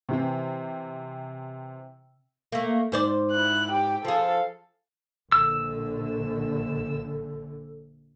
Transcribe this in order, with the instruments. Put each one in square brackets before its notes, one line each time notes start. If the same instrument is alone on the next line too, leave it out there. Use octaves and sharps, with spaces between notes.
[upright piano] C3 E3 C4
[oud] A3 A#3
G#2 C5 D5
[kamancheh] E4 F#6
G4 G5
[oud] F3 G#4 [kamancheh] A4 F5
[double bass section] A#1 D3 [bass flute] A4 [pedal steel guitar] E6